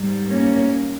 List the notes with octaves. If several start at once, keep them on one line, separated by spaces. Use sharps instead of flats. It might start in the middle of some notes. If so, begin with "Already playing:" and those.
Already playing: G#2 G3
A#3 C#4